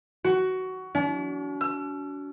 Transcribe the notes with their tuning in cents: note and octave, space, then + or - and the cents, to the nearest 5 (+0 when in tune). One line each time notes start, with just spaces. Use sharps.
F#4 +15
D4 -45
E6 +40